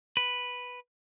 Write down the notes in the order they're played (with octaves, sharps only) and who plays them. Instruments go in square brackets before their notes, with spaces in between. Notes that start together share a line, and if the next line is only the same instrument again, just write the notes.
[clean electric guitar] B4